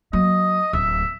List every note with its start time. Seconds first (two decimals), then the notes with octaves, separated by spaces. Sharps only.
0.13 F#3 A#3 D#5
0.73 D1 D2 E5